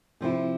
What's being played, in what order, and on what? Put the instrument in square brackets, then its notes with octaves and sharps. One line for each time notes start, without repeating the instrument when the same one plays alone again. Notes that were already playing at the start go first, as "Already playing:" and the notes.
[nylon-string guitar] C3 F3 C4 E4